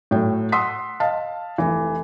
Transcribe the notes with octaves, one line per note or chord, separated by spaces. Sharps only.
A2 F#3 G5
F#5 C6 D#6 E6 B6
D#5 F5 A5
F1 E3